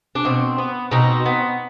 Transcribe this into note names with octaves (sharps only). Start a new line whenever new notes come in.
D4
B2 C4
B3
B2 C4 D#4
B3